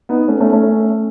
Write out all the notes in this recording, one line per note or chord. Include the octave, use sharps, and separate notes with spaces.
B3 D#4
A3 C#4
A3 C#4
A3 C#4